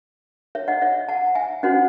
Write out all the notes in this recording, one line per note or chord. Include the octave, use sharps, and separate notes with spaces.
C#5 E5
D#5 F#5
C#5 E5
F#5 A5
E5 G#5
C#4 F#4 C5 D#5 F#5